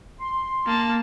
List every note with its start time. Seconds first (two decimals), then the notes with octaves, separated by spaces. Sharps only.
0.20 C6
0.66 A#3 A5